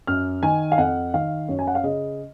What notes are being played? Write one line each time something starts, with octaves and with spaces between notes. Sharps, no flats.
F#2 F6
D#3 G#5
F5
F2 F#5
D#3 F5
F#2 C#5
G#5
F#5
F5
C#3 D#5